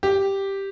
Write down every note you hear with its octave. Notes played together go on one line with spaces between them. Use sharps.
G4